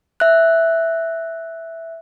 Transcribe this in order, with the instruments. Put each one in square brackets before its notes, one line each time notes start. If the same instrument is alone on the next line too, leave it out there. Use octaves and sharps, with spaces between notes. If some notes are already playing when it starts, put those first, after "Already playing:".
[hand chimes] E5 F#6